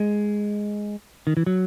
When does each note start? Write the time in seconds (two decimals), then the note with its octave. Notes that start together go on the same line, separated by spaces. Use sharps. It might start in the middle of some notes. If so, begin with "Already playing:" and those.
Already playing: G#3
1.27 D#3
1.37 E3
1.46 F#3